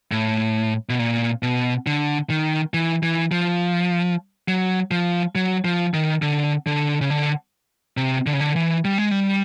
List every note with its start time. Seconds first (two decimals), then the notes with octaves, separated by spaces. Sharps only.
0.11 A2
0.89 B2
0.99 A#2
1.43 B2
1.86 D3
2.30 D#3
2.74 E3
3.03 E3
3.32 F3
4.48 F#3
4.91 F3
5.35 F#3
5.65 F3
5.94 D#3
6.22 D3
6.67 D3
7.01 C#3
7.10 D3
7.97 C3
8.27 D3
8.33 C#3
8.40 D3
8.56 E3
8.85 G3
8.98 G#3
9.11 G3